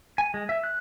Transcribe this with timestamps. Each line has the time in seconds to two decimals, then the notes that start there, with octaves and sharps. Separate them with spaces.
0.18 G#5
0.34 G#3
0.49 E5
0.64 F#6